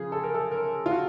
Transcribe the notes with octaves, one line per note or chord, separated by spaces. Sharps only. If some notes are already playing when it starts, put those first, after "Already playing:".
Already playing: C#3 F3 G#4
A4
A#4
A4
A#4
F4
F#4